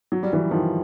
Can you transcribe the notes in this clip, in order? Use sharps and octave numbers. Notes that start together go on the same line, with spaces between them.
F#3
G3
E3 F#3
D#3 F3